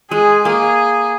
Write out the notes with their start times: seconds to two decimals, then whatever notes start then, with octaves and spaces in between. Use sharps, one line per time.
0.11 G#3 G#4
0.44 A#3 G#4